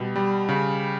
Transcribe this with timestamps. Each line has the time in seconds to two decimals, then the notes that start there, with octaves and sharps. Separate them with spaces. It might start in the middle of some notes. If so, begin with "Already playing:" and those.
Already playing: B2 G3
0.16 G3
0.49 C#3